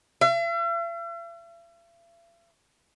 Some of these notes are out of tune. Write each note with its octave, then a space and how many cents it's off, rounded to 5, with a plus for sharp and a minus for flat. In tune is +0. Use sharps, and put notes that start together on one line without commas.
E5 +45